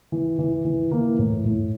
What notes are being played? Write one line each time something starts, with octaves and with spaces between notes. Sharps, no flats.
E3
E3
E3
E3 A#3
A2
A2